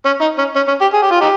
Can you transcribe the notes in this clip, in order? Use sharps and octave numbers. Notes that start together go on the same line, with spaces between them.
C#4
D#4
C#4
C#4
C#4
G4
G#4
G4
F4
D#4 G4